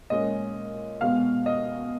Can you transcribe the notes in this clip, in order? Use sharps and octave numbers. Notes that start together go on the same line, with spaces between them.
A#2 G#3 C#4 D#5
B2 G#3 B3 F5
D#5